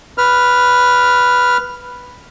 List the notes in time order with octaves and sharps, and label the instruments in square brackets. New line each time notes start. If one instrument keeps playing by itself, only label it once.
[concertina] B4 F6